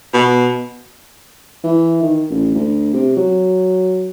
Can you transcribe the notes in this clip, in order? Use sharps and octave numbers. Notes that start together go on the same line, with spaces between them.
B2
E3
D#3
A1
D2
C3
F#3